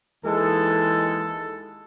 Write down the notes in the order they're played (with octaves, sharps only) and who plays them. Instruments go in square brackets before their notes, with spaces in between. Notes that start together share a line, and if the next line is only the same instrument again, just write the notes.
[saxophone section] D#2 E3 G#3 [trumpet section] A4